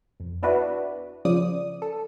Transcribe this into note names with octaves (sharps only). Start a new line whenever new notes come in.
F2
B3 D4 E4 F#4 B4 D5
C#3 F3 D5 D#6
A4